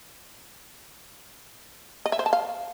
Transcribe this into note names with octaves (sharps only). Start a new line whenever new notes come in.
D#5
E5
C5
A5
F5